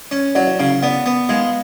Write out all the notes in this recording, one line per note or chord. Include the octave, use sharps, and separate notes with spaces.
C#4
F#3 D5 F#5
D5
C#3 F5
F5
B3 D5 F#5
B3
G#3 F5